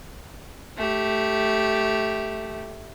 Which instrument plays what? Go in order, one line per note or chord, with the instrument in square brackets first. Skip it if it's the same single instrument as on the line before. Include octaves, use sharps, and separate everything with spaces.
[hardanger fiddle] A3 G4